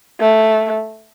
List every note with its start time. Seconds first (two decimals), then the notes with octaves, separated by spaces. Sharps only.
0.21 A3